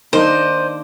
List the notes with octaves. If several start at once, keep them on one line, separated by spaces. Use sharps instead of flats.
D#3 A#3 D4 C5 D5 D#5